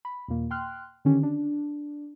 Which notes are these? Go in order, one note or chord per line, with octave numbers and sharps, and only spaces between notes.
B5
D#2 A#2 A#3
G5 C6 F6 F#6
D3 D#3 C#4 G4
D4